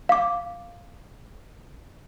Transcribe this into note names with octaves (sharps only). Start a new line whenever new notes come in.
F5 D6